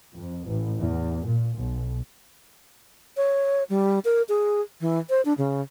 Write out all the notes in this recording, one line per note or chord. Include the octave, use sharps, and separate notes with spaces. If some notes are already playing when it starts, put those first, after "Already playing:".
F2
A1
E2
A#2
B1
C#5
G3
A#4
G#4
E3
C5
D4
C#3